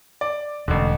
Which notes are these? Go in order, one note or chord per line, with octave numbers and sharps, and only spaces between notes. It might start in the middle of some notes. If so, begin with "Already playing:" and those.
D5
E1 A1 D3